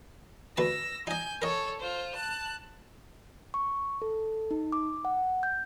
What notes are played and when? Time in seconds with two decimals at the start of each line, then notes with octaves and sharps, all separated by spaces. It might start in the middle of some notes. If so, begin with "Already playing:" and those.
0.57 D2 B4 A5 E6 A#6
1.07 D#4 D#5 G#5 G6
1.42 A4 A#4 C#5 D#5
1.80 F4 C5
2.15 A5 F#6
3.54 C#6
4.02 A4
4.51 D#4
4.72 D6
5.05 F#5
5.43 G6